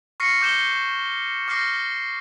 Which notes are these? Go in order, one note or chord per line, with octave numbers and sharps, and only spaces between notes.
C#6 F6 A#6 C7 C#7
D6 G6 E7 G7
D6 F6 G6 A#6 C7